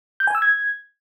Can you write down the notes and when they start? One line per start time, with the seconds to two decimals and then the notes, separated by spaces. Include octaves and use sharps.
0.20 G6
0.27 G#5
0.35 E6
0.42 G#6